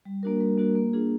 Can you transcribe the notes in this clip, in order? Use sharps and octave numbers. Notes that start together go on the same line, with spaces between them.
G3
A#3 D4 F#4 A#4
G3
A#3 D4 F#4 A#4
A#3
D4 F4 G#4